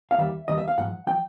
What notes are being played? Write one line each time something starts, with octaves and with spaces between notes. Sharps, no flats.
F5
D#2 D#3 G3 E5
D#2 D#3 G3 D#5
E5
F5
G#2 F3 F#5
F3 G5